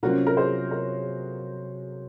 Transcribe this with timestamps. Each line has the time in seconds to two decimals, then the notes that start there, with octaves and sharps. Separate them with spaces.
0.03 C3 F#3 A#3 C#4 F4 F#4 A#4
0.27 A#4
0.37 G#4 C5
0.71 A#4 C#5